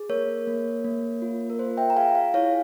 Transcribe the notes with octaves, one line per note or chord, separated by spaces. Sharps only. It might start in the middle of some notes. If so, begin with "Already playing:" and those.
Already playing: G#4
A#3 A#4 C#5
A#3
A#3
F4
A#4
F4 C5
E5 G5
A#5
G#4 F5 G#5
F5 G#5
E4 C#5 F5